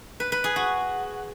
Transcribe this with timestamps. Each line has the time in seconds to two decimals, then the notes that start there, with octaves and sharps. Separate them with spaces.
0.20 B4
0.32 B4
0.44 G#4
0.56 F#4